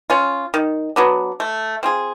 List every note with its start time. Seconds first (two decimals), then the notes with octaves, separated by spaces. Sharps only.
0.10 C#4 F4
0.54 D#3
0.96 F#3 B3 D4
1.40 A3
1.83 C4 F4 G#4